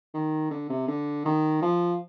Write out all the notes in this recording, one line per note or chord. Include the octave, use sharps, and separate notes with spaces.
D#3
D3
C3
D3
D#3
F3